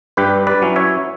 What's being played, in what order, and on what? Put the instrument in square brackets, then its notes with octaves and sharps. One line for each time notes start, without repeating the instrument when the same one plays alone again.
[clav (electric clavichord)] G2 G4 B4
B4 D5
F#3 C#4 E4
C#5 E5